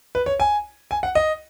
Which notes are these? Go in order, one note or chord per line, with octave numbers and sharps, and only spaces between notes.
B4
C#5
G#5
G#5
F#5
D#5